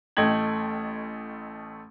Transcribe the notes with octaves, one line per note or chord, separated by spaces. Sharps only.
A1 A3 D#5 G5 G#6 F#7